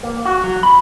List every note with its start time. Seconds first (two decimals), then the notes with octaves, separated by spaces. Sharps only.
0.03 A#3
0.25 F#4
0.44 F#3
0.63 B5